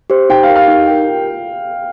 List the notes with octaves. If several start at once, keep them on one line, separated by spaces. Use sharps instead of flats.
G4 C5
D#4 G5
F5
G4 A#4 G5
F5
D#4
G4 A#4 G5
F4